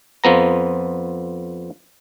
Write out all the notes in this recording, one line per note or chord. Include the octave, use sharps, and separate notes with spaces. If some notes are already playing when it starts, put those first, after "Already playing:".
F2 F3 B3 A#5